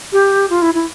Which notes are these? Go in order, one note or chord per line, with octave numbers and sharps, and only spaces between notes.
G4
F4
E4
E4